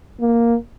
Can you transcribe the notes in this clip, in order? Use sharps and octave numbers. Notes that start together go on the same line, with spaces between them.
A#3